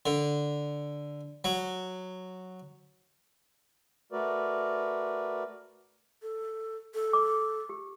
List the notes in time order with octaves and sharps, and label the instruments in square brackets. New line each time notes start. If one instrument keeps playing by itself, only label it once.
[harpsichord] D3
F#3
[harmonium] A3 F#4 A#4 B4 D5
[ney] A4
A4
[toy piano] D6
G4